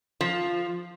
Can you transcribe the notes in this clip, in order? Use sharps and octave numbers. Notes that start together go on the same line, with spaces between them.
F3